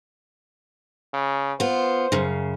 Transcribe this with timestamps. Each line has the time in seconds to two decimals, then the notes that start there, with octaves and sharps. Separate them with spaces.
1.13 C#3
1.60 B3 F4 C5
2.12 F#2 C#3